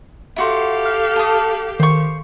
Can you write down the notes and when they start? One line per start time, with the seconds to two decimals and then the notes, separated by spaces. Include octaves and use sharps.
0.36 E4 F#4 G4 A4 F5 C6
0.86 F6
1.16 A5 D#6
1.80 D#3 C5 C#6